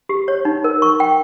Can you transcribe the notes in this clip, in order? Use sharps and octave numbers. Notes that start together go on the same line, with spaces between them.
G4
C#5
D#4
A#4
C#6
G5